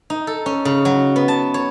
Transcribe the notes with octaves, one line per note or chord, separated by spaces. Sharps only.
D#4
A4
C#4
C#3
F#3
B3
A5
C#5